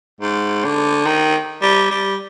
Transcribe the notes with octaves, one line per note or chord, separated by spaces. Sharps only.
G#2
D3
D#3
G3
G3